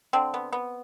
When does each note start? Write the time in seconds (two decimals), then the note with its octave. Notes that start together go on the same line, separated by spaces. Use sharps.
0.13 D3 C4
0.34 B3
0.53 B3